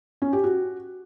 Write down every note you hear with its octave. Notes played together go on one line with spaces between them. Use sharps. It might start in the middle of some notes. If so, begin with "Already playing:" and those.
C#4
G4
F#4